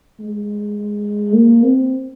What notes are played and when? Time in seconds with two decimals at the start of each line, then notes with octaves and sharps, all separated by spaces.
0.20 G#3
1.34 A#3
1.63 C4